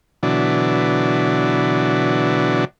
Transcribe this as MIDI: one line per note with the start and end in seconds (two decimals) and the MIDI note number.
0.23 2.65 47
0.23 2.65 50
0.23 2.65 52
0.23 2.65 54
0.23 2.65 62